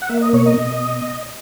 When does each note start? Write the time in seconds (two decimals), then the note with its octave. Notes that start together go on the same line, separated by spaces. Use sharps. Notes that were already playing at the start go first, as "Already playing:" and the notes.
0.02 F#5
0.09 A#3 E5
0.21 D#5
0.33 B2 C#5
0.46 D#5
0.58 B2